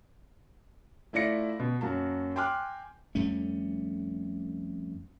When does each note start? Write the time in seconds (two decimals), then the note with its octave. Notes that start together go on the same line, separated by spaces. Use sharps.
1.13 A3 E4 F4 D5 A#6 C#7
1.59 B2
1.81 F#2 A#3 F#4 A5
2.36 G5 G#5 C6 D6 F6 F#6
3.15 F2 G3 A3 C#4